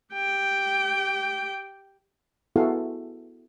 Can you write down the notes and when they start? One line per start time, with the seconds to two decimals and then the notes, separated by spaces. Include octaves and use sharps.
0.13 G4 G5
2.56 B3 E4 F#4 G#4 A4 F5